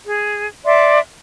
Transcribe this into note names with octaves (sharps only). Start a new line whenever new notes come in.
G#4
D5 E5 C6